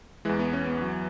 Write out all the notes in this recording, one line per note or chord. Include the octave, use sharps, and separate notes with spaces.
E2 E3 G#3
B3
C#4
B3
F#3